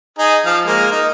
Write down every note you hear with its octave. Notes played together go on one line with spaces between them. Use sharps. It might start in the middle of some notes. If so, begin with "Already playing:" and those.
D#4 G#4
F3 F5
G#3 A#3
D#4